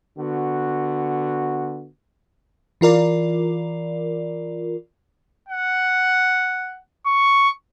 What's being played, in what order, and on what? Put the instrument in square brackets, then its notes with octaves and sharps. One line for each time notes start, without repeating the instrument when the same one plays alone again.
[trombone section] D3 B3 F#4
[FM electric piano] E3 F4 A#4 D5
[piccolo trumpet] F#5
C#6